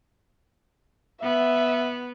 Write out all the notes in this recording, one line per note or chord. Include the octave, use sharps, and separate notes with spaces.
B3 E5